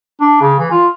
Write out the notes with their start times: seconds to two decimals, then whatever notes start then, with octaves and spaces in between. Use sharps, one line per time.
0.21 D4
0.41 C#3
0.59 E3
0.71 F4